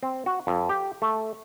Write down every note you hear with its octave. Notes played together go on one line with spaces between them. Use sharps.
C4
F#4
F2
G4
A3